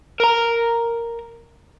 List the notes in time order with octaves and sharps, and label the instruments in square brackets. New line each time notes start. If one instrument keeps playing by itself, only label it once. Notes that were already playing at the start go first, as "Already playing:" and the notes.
[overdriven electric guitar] A#4 A#5